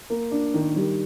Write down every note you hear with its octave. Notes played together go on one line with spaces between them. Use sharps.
A#3
D4
D#3
G3